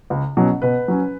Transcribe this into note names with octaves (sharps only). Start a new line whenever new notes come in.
C#2
B2 F#3 C#4
B2 B4
F#3 C#4